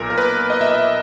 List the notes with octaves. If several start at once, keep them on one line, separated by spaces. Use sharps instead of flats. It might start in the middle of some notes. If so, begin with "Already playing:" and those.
Already playing: B1 A#2 A#4
A#4
B4
D#5
E5
D#5